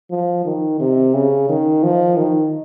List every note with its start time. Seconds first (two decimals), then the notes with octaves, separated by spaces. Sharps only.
0.10 F3
0.45 D#3
0.80 C3
1.14 C#3
1.49 D#3
1.83 F3
2.17 D#3